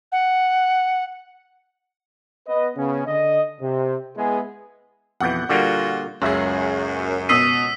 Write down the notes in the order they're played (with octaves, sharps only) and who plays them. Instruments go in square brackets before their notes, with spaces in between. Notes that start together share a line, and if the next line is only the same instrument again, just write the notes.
[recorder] F#5
[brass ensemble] B3 B4 D#5
C#3 B3 C#4
D3 D#5
C3
G#3 B3 E4 G#4
[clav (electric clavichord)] F2 B2 E3 [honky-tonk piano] F#5 G6
[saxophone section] A#2 F4 F#4 [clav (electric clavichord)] D3 G3 A#3
[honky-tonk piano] F#1 G#4 [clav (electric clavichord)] C#2 E5 [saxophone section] F#2
[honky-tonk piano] B2 D#6 C7 [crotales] E6 B6 D#7